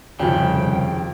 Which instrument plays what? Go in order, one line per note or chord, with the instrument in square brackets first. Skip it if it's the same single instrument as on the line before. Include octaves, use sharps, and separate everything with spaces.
[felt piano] D#1 F2 [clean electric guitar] C2 C#3 [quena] G5